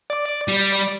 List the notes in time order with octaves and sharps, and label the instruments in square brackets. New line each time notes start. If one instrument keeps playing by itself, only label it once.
[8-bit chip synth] D5 D6
[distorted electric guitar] G3